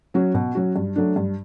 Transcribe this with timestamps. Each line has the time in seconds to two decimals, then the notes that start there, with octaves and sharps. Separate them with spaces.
0.14 F#3 C#4 F#4
0.34 B2
0.55 F#3 C#4 F#4
0.76 G2
0.96 F#3 A3 D4
1.16 G2